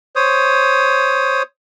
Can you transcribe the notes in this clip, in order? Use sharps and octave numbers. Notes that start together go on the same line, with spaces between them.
C5 C#5 D#6